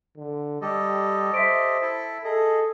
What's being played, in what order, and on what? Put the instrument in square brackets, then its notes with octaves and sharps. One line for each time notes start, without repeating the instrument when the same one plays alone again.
[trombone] D3
[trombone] G3 [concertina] G4 A4 D#5
[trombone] C5 [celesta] E5 B6 D7
[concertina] E4 A4
[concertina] G#4 D#5 [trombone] A4